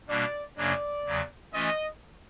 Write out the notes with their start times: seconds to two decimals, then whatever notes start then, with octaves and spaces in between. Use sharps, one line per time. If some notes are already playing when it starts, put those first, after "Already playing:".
0.08 B2 G3 A#3 D4 D5
0.56 F#2 C#3 F#3 A#3 D4 D5
1.04 E2 C#3 F#3
1.53 E3 A3 C#4 F4 D#5